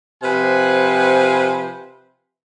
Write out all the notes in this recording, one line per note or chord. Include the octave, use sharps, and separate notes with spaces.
C3 F3 B4 C5 G#5